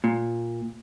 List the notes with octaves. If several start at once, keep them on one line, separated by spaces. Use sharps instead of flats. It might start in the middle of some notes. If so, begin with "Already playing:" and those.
A#2